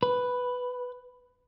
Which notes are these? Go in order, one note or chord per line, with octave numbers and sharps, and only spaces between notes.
B4